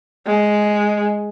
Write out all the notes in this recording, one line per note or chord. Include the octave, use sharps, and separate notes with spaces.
G#3